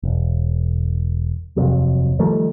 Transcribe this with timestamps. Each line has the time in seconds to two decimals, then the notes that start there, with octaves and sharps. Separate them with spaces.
0.03 E1
1.56 D#1 F2 C3 F#3
2.19 D#3 F3 G3 A3